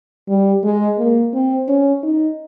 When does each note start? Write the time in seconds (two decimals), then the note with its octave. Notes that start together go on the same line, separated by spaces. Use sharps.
0.28 G3
0.64 G#3
0.98 A#3
1.34 C4
1.68 C#4
2.03 D#4